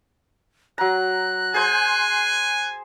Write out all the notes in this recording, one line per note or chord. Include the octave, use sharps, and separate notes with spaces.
F#3 A#5 F#6
G#4 C5 G#5 C6